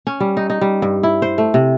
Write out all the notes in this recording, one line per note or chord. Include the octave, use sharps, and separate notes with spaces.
C#4
G3
D#4
D#4
G3
G2
E4
C5
A3
C3